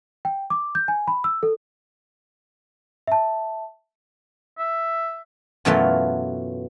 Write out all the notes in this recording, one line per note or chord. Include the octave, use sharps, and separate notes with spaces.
G5
D6
G6
G#5
B5
E6
A4
E5 A5
E5
F#2 B2 E3 F#3 A3 F4